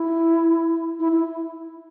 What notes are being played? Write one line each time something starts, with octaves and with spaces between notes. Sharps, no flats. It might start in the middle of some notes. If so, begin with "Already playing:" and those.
Already playing: E4
E4
E4